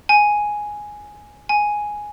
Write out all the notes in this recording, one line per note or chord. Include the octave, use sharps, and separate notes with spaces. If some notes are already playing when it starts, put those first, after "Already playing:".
G#5
G#5